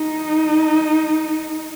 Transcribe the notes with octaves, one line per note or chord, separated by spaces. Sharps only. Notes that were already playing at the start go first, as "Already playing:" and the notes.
Already playing: D#4